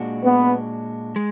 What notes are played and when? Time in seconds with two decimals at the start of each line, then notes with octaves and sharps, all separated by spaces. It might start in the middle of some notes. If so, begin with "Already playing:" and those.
Already playing: A#2 G#3 D4 F#4
0.25 B3
1.16 G#3